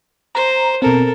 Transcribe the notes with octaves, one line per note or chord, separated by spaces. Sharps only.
C5 A#5
B2 C4 A4 A#4